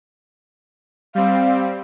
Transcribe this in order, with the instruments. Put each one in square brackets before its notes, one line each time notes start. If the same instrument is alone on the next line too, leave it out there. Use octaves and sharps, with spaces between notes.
[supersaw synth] G3 C4 [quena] F5